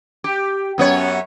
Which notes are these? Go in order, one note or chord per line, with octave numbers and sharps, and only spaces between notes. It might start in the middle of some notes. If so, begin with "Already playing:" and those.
G4
F#2 B3 C#5